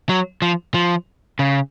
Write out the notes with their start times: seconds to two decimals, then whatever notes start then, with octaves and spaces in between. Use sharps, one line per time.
0.09 F#3
0.42 F3
0.74 F3
1.39 C#3